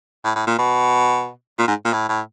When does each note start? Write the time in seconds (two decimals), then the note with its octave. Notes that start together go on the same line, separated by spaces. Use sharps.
0.25 A2
0.36 A2
0.47 A#2
0.59 B2
1.59 A#2
1.68 G#2
1.85 A#2
1.93 A2
2.09 A2